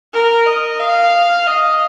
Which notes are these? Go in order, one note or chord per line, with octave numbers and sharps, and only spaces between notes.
A#4
D#5
F5
D#5